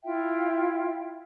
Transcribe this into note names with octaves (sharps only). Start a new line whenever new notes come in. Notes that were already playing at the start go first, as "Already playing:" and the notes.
E4 F4 E5 G5